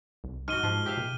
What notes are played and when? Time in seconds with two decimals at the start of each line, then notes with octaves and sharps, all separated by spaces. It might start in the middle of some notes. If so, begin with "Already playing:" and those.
0.24 C2
0.48 G#2 F#4 F6 D#7 G7
0.63 G#2 F3
0.86 G4 E5 F5
0.97 B2